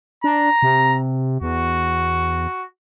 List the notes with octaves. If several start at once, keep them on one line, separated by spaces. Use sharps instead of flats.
D4 A#5
C3
E2 F#4